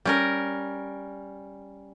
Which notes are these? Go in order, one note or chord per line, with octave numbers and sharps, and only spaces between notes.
G3 C#4 A#4